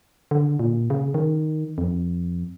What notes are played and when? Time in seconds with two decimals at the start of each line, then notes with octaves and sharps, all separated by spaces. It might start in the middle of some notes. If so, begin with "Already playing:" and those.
0.31 D3
0.59 A#2
0.90 C#3
1.14 D#3
1.78 F2